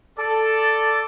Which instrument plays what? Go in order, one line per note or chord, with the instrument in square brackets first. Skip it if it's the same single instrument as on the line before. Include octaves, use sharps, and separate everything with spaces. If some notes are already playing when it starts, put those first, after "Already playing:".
[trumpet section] A4 [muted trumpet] D5